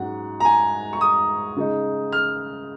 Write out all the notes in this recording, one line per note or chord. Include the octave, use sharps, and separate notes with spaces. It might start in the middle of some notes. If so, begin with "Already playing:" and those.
Already playing: G#2 F#3 C#4 F#5
A#5
G#5
C#6
D#6
C#3 G#3 D#4
F6